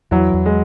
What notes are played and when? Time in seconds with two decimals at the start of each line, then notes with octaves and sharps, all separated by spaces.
0.11 E2 E3 F#3
0.34 E2
0.46 G#3